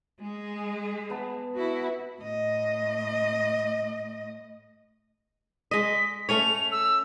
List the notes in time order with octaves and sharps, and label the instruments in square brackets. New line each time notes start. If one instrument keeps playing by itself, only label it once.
[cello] G#3 G#4
[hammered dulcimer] B3 A5
[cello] E4 F#4
A2 D#5
[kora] G#3 D#5 [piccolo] B6
[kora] A3 C#4 C#5 [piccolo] F7
[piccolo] E6